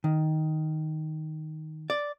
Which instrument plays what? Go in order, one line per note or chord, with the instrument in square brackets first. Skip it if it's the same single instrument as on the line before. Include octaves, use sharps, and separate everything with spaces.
[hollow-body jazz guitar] D#3
D5